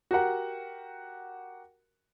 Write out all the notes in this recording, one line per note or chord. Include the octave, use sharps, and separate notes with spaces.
F#4 G4 A#4 F#5